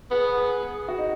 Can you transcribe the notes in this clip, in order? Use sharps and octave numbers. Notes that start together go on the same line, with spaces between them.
B3 G#4
G#4
G#4
F#4
D#4